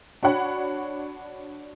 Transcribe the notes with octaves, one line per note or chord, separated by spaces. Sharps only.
D4 F#4 C#5 F#5 B5